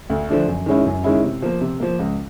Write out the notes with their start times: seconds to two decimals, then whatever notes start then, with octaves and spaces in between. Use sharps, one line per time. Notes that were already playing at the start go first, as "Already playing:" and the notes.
0.10 D2
0.29 D3 F3 A3 D4
0.48 F#2
0.66 D#3 G#3 C#4 E4
0.86 F#2
1.04 D#3 G#3 C#4 E4
1.24 C3
1.42 F3 A#3
1.61 C3
1.80 F3 A#3
1.99 C#2